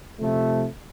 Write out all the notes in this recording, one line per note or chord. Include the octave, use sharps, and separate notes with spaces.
C3 F3 A3